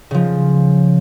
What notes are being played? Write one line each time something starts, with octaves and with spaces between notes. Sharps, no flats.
C#3 F3